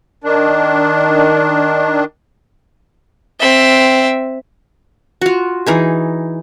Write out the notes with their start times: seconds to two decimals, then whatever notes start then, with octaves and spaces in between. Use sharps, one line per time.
0.24 D#3 D4
3.40 C4 E5
5.21 F4 F#4
5.66 E3 D#4 G#4